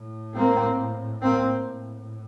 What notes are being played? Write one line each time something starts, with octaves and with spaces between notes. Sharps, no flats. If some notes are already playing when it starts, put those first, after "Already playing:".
Already playing: A2
A#3 C4
A#3 C4
A2